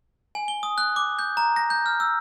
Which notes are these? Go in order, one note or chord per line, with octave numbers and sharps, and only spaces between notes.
G#5
G7
D#6
F#6
D6
G6
A#5
A#6
G6
F6
E6